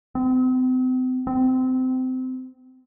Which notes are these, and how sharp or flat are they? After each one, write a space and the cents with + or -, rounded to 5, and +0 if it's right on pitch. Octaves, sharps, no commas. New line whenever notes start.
C4 -40
C4 -25